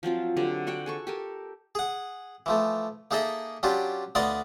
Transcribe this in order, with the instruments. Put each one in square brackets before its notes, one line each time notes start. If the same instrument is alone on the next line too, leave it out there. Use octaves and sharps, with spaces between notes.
[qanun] F3 F#3 C4 F4
D3 F#3 G4 C5
D4 F#4 F#5 G5
G#4 A4 C#6
G4 A4 A#4
[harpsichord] G#4 F#5
E3 F3 A3
A#3 D#4 G#4 A4 D#5 E5
F#3 C#4 D4 F4 G4
D2 B3 D5 D#5 F5 C6